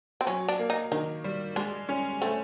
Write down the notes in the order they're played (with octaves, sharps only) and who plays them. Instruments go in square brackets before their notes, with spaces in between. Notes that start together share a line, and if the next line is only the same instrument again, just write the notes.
[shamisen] C4
[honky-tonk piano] F#3 [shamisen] C#4
[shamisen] D4
[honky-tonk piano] A#3
[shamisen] D#4
[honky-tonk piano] D#3 [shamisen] D#4
[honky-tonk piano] G3
[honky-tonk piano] G#3 [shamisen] D4
[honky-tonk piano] C#4
[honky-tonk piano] A3 [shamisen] C4